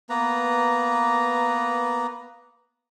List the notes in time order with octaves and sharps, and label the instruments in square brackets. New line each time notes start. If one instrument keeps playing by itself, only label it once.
[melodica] A#3 B3 B4 A#5